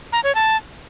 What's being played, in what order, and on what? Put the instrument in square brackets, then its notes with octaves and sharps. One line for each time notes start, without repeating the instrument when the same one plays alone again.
[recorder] A#5
C#5
A5